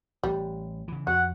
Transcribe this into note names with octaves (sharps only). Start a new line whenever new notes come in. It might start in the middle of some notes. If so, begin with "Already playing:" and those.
A1 G3
C#3 E3
F2 F#4 F#5